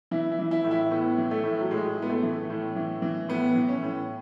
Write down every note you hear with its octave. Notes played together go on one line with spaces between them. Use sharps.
E3 E4
E4
E3
E4
A2
E4
A2 B3
E3
A3
A2
F#3
A2 G#3
A2
B3
A3
E3
A2
E3
E3
A2 B3
E3
C#4
A2